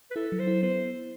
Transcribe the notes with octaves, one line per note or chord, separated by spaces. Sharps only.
B4
E4 A4
F#3
C5
E4
B3 C5